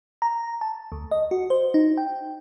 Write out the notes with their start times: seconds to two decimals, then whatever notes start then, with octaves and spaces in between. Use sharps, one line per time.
0.22 A#5
0.61 A5
0.92 D2
1.11 D#5
1.31 F#4
1.50 C5
1.74 D#4
1.97 G5